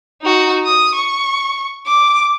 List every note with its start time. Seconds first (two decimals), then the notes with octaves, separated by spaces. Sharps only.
0.22 D#4 F#4
0.66 D#6
0.95 C#6
1.86 D6